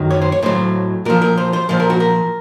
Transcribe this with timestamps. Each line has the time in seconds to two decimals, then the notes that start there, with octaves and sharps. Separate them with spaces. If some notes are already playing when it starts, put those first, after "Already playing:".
Already playing: F#2 D#3 F#3
0.11 C#5
0.22 C5
0.32 C#5
0.43 A2 F#3 C5
1.05 A#2 F3 A#4
1.22 A#4
1.37 C5
1.53 C5
1.69 A#2 F3 C5
1.80 A#4
1.90 F#4
2.00 A#4